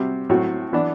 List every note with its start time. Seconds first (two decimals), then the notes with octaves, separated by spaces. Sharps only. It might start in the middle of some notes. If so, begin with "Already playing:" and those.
Already playing: C3 G3 C4 F#4
0.30 A2 F#3 C4 F#4
0.73 E3 B3 D4